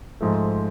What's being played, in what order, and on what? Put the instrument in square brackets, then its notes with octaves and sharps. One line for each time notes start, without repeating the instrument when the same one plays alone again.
[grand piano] G#2 F3 A3